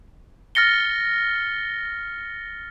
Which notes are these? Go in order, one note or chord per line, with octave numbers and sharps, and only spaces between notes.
F6 A6 A#6 C#7 G7